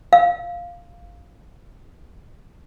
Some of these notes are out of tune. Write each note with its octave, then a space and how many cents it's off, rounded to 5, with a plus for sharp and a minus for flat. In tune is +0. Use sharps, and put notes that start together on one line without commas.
F5 +0